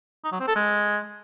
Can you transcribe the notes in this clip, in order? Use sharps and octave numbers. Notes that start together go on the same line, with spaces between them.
D#4
F#3
C4
A4
G#3